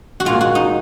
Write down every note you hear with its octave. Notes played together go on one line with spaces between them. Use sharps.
F#4
A#2 G#3 F4
F#4
D#4